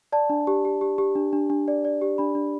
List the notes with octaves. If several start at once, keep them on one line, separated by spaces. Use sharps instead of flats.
D5 A5
D4
G4
G4
G4
G4
D4
D4
D4
D5
D5
G4
D4 B5
D4